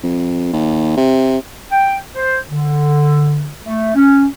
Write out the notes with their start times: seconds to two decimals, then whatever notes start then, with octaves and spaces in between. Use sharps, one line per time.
0.03 F2
0.53 D#2
0.97 C3
1.71 G5
2.15 C5
2.49 D3
3.64 A3
3.95 C#4